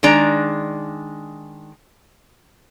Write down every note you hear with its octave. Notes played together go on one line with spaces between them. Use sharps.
D#3 G#3 D4 A#5